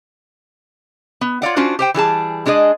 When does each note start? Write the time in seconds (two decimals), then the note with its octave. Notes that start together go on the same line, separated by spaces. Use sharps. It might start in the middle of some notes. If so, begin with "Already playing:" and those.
1.21 B3
1.42 F4 C#5 D5 F#5
1.56 C#4 D4 F4 F#4 C5
1.79 G4 C5 G5
1.94 E3 G3 G#4 A5
2.46 G#3 D4 G#4 A4 D#5